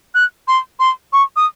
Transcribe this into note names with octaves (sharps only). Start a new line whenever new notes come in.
F#6
C6
C6
C#6
D#6